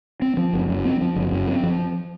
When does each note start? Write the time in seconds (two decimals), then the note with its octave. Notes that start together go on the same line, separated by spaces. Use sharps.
0.22 C4
0.37 F3
0.53 F#1
0.69 F#2
0.85 C4
1.01 F3
1.16 F#1
1.32 F#2
1.47 C4
1.63 F3